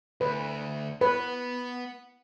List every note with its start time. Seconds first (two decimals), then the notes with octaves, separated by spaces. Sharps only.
0.21 D2 B4
1.01 B3 B4